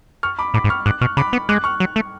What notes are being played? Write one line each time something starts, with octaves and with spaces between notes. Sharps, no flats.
C#6 F6
B5 D6
A2 B5 D6
G#2
C#6 F6
G#2 D6 F#6
B2 C#6 F6
C#3 B5 D6
B3
G#3 D6 F#6
C#6 F6
F#3
A3